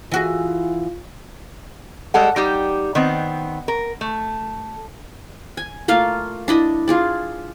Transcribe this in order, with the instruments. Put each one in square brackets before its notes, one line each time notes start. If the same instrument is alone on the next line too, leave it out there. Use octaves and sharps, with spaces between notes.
[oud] E3 F#4 G#4 [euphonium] F4
[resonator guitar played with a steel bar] G3 G#3 A4 F#5
G3 D#4 G4
D#3 B3 C4
A#4
A3
[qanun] G#5
A3 A#3 F4 F5
D4 E4 D#5
F4 G#4 D5